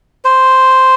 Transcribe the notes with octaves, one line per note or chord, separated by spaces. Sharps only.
C5